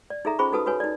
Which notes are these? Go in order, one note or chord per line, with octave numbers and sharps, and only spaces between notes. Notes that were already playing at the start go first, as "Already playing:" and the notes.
D5
D#4 G#4 A4 E5 A#5
C#4 F4 G#4 C5 B5 C#6
D#4 F#4 A4 B4 A5 D#6
F#4 B4 C#5 G#5
D#4 D5